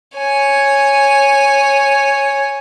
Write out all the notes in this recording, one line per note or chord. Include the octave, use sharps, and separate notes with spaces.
C#5 G#5